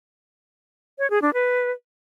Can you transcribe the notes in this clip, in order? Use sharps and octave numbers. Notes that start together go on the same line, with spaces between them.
C#5
G#4
D4
B4